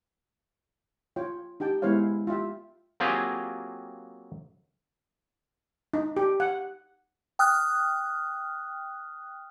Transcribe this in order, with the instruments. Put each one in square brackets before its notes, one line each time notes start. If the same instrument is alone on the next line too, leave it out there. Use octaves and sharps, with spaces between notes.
[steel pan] F4 C#5 G5
D#4 G4 G5 A5
G#3 B3 E4 C5 C#5 F5
F4 G4 E5 G5
[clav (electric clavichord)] F#3 A#3 C4 F4 G4 G#4
[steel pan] D#4
G4
F#5
[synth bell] G5 D#6 F6 F#6